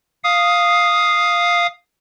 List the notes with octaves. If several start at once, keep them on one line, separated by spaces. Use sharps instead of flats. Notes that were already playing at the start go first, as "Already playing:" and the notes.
F5 D#6